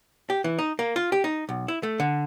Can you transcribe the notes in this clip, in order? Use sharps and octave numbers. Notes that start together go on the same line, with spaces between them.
G4
E3
D#4
A#3
F4
G4
D#4
B1
E4
A3
D3